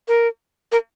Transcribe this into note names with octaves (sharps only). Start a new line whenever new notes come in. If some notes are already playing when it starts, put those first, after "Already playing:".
A#4
A#4